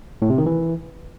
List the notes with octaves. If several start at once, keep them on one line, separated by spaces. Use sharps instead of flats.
A2
C3
D#3
E3